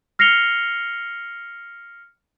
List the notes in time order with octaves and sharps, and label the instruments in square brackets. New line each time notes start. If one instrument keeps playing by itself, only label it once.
[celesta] F6 A#6 C7 C#7 F7 G7